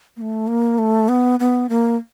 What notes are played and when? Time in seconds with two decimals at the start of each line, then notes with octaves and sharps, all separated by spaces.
0.17 A#3
0.21 A3
0.47 A#3
0.78 A3
1.09 B3
1.40 B3
1.69 A#3